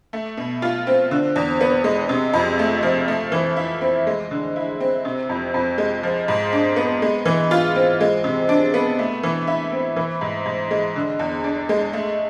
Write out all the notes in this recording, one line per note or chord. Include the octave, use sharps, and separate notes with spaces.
A3
B2
F4
C4
D3
E2
B3
G#3
C3
F2
A3
F3
A3
E3
E4
C4
G#3
D3
E4
C4
C3
F2
F2
G#3
F3
G#2
D4
B3
G#3
E3
F4
C4
G#3
C3
D4
B3
A3
E3
E4
C4
E3
G#2
G#2
G#3
D3
E2
D4
G#3
A3